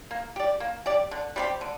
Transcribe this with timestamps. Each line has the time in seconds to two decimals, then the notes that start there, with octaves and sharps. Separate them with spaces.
0.11 A#3
0.36 G4 D5
0.60 A#3
0.86 G4 D5
1.11 D3
1.36 G3 C4 G4
1.61 D3